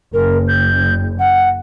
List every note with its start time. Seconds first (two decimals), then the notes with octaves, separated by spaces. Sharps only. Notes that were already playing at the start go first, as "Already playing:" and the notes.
0.14 F#1 A#4
0.48 G6
1.19 F#5